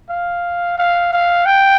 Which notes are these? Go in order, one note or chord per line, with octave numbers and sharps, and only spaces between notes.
F5
F5
F5
G5